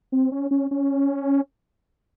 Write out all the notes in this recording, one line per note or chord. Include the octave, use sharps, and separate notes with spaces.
C4
C#4
C#4
C#4